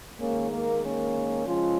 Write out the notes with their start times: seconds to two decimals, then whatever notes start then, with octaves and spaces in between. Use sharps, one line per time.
0.20 D#3 G#3 A#3 C#4
0.51 A#3
0.83 A#3 C#4
1.46 C#3 F3 G#3 C#4 F4